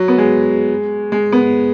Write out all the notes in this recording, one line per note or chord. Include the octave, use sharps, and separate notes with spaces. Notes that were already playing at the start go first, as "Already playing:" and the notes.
Already playing: F#3
B3
G#3
G#3
B3